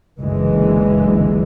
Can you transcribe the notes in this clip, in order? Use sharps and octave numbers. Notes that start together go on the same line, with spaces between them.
F#1 C#2 D3 E3 G#3